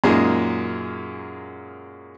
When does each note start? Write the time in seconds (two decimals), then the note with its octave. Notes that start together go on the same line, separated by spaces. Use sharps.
0.04 F#2 A#2 G#3 A#3 D#4